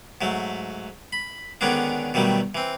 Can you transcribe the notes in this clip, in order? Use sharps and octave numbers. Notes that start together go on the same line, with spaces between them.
G#2 F#3 A3
B5
D3 D#3 G#3 B3 C#4 D4
B2 D#3 F#3 G3 A3
E3 C4